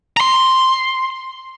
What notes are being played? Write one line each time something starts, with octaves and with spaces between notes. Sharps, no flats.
A#5 C6